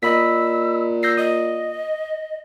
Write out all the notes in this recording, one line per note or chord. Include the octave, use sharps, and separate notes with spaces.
A#2 D#5 B5 E6 B6
E6 G6 A#6 C7
D#5 D#6